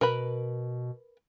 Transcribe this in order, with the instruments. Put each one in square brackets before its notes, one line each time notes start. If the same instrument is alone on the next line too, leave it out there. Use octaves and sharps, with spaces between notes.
[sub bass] B2 [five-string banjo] A#4 B4 B5